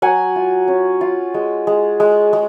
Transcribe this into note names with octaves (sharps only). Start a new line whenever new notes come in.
F#3 F#5 G#5
F4
C#4
F4
G#3
G#3
G#3
G#3